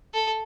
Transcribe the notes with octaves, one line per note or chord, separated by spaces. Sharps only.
A4